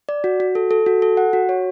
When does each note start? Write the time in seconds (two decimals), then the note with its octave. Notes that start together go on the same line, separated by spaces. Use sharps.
0.09 D5
0.24 F#4
0.40 F#4
0.55 A4
0.71 A4
0.86 F#4
1.02 A4
1.17 F#5
1.33 F#4
1.49 C#5